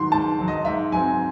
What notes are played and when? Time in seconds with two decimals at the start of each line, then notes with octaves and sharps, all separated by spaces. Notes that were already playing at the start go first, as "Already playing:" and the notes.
Already playing: G#2 D#3 F#3 C6
0.12 G#2 A5
0.39 D#3 F#3
0.48 D#5
0.65 G#2 E5
0.92 F#3 G#5
0.96 C4